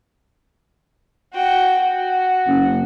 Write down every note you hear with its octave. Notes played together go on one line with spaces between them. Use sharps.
F#4 G5
F#4
F#1